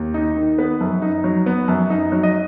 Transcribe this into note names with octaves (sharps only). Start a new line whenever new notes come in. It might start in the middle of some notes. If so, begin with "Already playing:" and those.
Already playing: D#2
D#4
D#3
B3 B4
F#2
D#4
F#3
B3
F#2
D#4
F#3
D#5